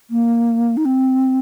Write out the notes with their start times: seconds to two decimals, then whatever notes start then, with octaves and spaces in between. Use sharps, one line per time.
0.10 A#3
0.77 D#4
0.85 C4